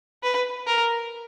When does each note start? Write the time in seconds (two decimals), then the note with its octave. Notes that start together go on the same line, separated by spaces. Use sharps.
0.23 B4
0.67 A#4